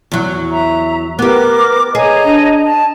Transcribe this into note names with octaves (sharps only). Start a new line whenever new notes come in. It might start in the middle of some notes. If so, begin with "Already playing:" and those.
E2 F#3
E5 A#5
B3 G4 A#4 B4 D6
G#4 C#5 D#5 A#5
D4
A5